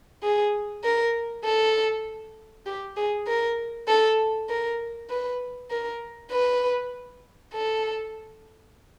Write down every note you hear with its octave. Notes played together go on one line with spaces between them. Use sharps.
G#4
A#4
A4
G4
G#4
A#4
A4
A#4
B4
A#4
B4
A4